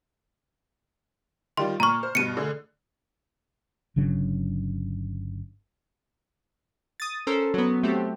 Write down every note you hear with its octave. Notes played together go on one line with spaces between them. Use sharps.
D#3 G3 F4 C6
A#2 A#5 C#6 F6
C5
G2 B2 C#7 D#7
D3 A3 G#4
G1 C#3 F#3 D4
D#6 A6
C#4 A4 A#4 C5
F#3 B3
A3 C4 F#4 G4